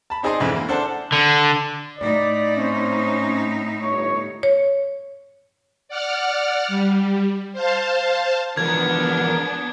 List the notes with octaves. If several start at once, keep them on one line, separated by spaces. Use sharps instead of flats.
A5 B5
C4 D#4 G#4 D5 D#5 C6
F2 G#2 D3 E3 E5
A#3 E4
D4 A4 C5 F#5 A5
D3
A2 D#4 D5
C4 C#4 C5
G1 C#5
C#5
D5 F#5 F6
G3
C5 F5 A5
E3 F3 G#3 B3 D4 A#4 G#6